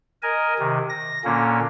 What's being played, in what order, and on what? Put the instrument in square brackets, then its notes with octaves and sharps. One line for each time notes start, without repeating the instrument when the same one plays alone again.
[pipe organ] A#4 D#5 G#5
C3 D#3
A#6
A#2 D3 A#3 C#4